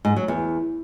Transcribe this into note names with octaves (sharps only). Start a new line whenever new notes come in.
G#2
F#3
E2